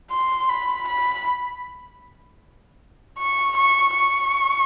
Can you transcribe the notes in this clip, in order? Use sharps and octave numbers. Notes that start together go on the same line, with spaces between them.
C6
B5
B5
C#6
C#6
C#6